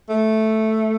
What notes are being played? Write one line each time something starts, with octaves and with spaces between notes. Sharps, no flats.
A3